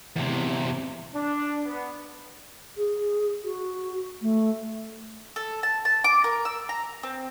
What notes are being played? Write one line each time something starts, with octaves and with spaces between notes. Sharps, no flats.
E2 C3
D4
B3
G#4
F#4
A3
A4
A5
A5
D6
A#4
E6
A#5
C4